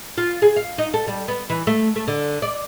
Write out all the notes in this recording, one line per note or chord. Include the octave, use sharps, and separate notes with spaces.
F4
G#4
F5
D#4
A4
G3
B3
E3
A3
A3
D3
D5